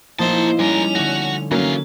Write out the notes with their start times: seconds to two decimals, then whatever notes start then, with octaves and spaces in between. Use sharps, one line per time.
0.19 A#2 F3 A#3 D#4 E4 C5 A5
0.59 G3 G#3 C#4 A#4 F7
0.95 D3 A3 F#4
1.51 E3 F#3 A#3 C#4 F5